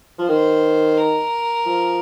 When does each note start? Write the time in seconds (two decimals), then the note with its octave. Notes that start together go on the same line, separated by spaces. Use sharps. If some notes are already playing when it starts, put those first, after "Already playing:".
0.18 F3
0.28 D#3 C5
0.97 A#4
1.66 F3